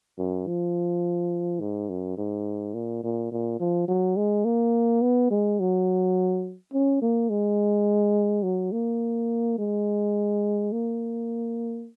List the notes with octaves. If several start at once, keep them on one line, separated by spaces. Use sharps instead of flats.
F#2
F3
G#2
F#2
G#2
A#2
A#2
A#2
F3
F#3
G#3
A#3
B3
G#3
F#3
C#4
A#3
G#3
F#3
A#3
G#3
A#3